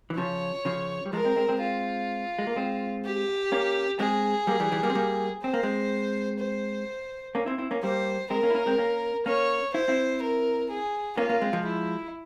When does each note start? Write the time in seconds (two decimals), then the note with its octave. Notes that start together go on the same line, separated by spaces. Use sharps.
0.10 E3
0.17 C#3 F3 C#5
0.65 C#3 F3
1.06 G3
1.13 F3 G#3 A#4
1.25 G#3 C4
1.36 G#3 C4
1.49 G#3 C4
1.61 F4
2.39 G#3
2.47 A#3
2.56 G#3 C4
3.05 G4
3.52 A#3 C#4
4.00 G#3 C4 G#4
4.47 G3 A#3
4.60 E3 G3
4.72 E3 G3
4.83 G3 A#3
4.90 C4
4.95 G3 A#3
5.43 C4 C5
5.54 A#3
5.63 G#3 C4
6.39 C5
7.35 A#3 C#4
7.46 C4 E4
7.58 C4 E4
7.71 A#3 C#4
7.83 G3 A#3 C5
8.30 G#3 C4 A#4
8.43 A#3 C#4
8.50 E4
8.55 A#3 C#4
8.66 G#3 C4
8.78 A#3 C#4
9.26 A#3 C#4 C#5
9.74 E4 C5
9.88 C4 E4
10.22 A#4
10.70 G#4
11.17 A#3 C#4 F4
11.29 A#3 C#4
11.42 G#3 C4
11.53 F3 G#3
11.65 E4